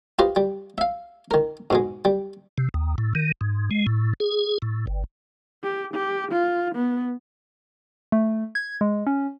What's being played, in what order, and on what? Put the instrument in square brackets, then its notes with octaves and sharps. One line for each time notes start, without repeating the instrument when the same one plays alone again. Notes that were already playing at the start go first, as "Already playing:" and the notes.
[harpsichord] F4 G4 B4 C5 D#5
G3
E5 F5
D#3 A#4
G#2 B2 G#3
G3
[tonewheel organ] C3
D#2
A2
D#3
G#2
G#3
A2
G#4
A2
G1
[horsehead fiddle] G4
G4
F4
B3
[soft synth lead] A3
G#6
G#3
C#4